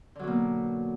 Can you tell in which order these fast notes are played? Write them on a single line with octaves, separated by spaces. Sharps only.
D3 F#3 B2 A#3